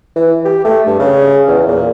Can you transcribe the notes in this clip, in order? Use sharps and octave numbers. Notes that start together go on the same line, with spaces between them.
E3
G4
A3
G2
C#3
E2
A#2